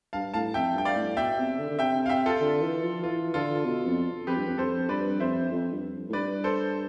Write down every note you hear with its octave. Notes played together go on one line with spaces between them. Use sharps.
G2 F5 A5
A2 F5 A5
F2 E5 G5
G2 G5
D5 F5
A2
B2 E5 G5
C3
D3
D3
C3 E5 G5
F5
E5 G5
F4 A4
D3
E3
F3
E3 F4
D3 F4 A4
B2
F2
F2 G4 B4
G2
F2
F2 A4 C5
G2 B4 D5
F2 C5 E5
F2
G2
A2
G2 B4 D5
A4 C5